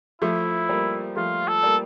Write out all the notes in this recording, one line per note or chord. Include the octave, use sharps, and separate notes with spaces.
F3 A3 E4
G3 A#3
F3 A3 F4
A4
G3 A#3